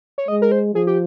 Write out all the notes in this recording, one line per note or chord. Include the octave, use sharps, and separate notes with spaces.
C#5
G#3 D#5
A#4
C5
F3 G#4
G4